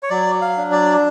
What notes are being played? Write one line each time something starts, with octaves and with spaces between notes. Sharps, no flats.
C#5
F#3 D5
F5
D4
D5